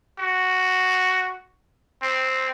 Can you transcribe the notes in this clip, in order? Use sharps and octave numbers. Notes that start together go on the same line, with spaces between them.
F#4
C4